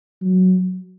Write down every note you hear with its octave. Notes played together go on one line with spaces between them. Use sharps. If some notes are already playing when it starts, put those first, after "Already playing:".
F#3